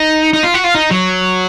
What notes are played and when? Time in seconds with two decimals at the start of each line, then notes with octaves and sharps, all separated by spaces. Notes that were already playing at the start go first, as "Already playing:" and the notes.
Already playing: D#4
0.33 D#4
0.43 F4
0.54 F#4
0.64 F4
0.75 D#4
0.91 F#3